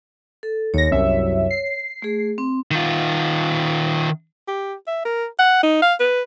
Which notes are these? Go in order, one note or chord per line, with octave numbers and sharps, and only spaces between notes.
A4
D#2 C#5 A#6
C2 F#2 E5
C7
A3 G#4
C4
D#3 F4
G4
E5
A#4
F#5
D#4
F5
B4